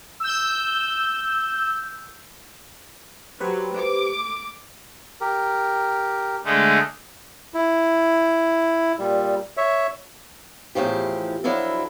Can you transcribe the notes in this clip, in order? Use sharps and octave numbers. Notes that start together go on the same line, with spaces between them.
E6 G6
F#3 G4 B4 C5
D6
G4 A#4
D3 G#3 A3
E4
A#2 G3
C#5 E5
E2 A2 F3 G4
F3 F#3 D4 E4 A4